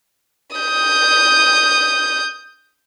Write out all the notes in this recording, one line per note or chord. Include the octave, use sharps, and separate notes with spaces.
D#6 G6